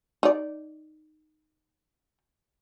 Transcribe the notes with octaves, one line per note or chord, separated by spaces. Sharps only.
D#4 D5